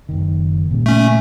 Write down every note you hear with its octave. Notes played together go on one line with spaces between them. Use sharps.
F#1 D#3
A#2 C#3 G3
A3 C#4